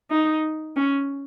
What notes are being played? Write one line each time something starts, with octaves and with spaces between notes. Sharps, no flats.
D#4
C#4